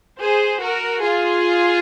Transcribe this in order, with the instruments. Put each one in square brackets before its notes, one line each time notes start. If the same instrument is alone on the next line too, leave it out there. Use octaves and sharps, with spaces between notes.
[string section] G#4 C5
F#4 A#4
F4 G#4